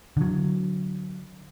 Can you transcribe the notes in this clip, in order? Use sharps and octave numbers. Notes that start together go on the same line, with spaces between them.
D3 F#3